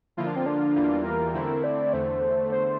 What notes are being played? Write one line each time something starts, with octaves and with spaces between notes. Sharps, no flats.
D3 F3 A#3 E4 F4
D4
C4
D4
E2 E3 G3 A#3 F4
A#4
D3 A3 C4 E4
D5
E2 D3 A3 C5
C5